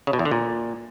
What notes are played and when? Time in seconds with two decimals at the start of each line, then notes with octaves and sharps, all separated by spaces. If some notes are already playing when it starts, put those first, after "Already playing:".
0.07 C#3
0.13 B2
0.19 E2
0.25 D3
0.31 A#2